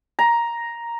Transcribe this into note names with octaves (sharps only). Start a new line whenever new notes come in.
A#5